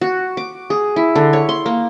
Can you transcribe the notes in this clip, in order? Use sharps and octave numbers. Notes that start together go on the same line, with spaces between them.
F#4
D6
G#4
E4
D3
C#5
C6
A#3